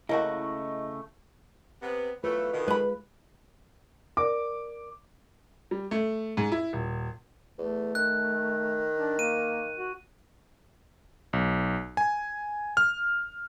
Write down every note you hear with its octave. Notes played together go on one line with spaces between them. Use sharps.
C#3 A3 A#3 C#4 E4 F#4 D#5
C3 B3
E3 F#3 A3 F4 B4
B2 D3 D#3
G#3 B4 B5
A#4 D5 D6
G3
A3
G#2
E4
D#1
E2 A3
D#3 F#6
D4
A#3 D#7
F#4
B1
G#5
F6